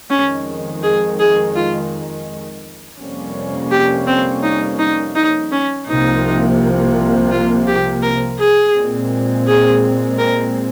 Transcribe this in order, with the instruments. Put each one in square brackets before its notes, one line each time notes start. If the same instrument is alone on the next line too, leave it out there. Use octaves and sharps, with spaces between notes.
[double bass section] F2 D#3 G#3 [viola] C#4
[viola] G#4
G#4
F4
[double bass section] F2 C3 G3 A#3 C#4
[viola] G4
C4
D#4
D#4
D#4
C#4
[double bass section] C2 C3 F3 A#3 [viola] D#4
[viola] F4
G4
A#4
G#4
[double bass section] A#2 G#3 C4
[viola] G#4
A#4